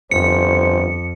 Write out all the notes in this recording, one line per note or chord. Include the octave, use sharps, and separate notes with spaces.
G1 F2 C5 C#7